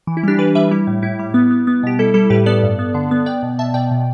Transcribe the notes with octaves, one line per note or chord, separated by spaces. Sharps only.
E3
E4
G3 D4 G4
E3 G4 B4
G3 B4 E5
G3 E4
A2
A2 E4
G3
B3
B3
B3
B2 G4
G3 E4 A4
G3 E4 A4
A2 G4 B4
B3 A4 D5
G2
B3
D3
B3
B3 D5 G5
B2
B2 E5 A5
B2 D5 G5
B2